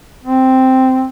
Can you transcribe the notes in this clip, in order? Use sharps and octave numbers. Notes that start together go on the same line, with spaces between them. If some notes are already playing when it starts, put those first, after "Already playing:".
C4